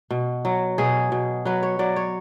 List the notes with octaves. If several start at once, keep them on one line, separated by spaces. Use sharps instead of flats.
B2
F#3
B2 G#4
B2
F#3 B4
C#5
F#3 D5
C#5